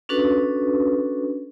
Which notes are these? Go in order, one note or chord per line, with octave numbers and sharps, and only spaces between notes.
C#4 D4 F#4 A4 B4